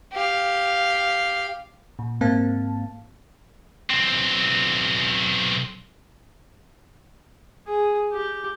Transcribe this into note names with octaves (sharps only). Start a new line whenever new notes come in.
G4 F5
A#2
G#2 A#3 C4 F5 A5
B1 C4
G#4
G4